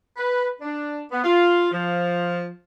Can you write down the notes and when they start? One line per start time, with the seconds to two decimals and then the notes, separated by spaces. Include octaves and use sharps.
0.17 B4
0.62 D4
1.11 B3
1.24 F4
1.71 F3